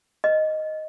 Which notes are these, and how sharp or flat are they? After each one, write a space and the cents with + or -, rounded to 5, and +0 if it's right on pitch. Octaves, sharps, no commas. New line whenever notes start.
B4 +0 D#5 +0